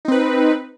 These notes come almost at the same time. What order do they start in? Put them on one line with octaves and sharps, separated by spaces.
D#4 C4 B4